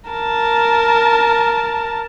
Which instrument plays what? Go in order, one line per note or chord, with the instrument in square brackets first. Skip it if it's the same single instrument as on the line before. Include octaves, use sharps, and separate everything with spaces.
[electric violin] A#4 A5